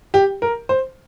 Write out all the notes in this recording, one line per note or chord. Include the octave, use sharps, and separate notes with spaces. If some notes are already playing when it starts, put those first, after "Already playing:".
G4
A#4
C5